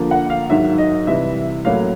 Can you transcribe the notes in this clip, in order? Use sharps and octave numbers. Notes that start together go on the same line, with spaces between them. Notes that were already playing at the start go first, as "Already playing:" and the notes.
Already playing: D3 F3 A#3
F#5
F5
G#2 D#3 F#3 E5
D#5
C3 E3 G3 E5
A2 F#3 A#3 C#4 F5